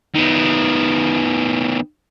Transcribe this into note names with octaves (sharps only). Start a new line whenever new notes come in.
D#3 B3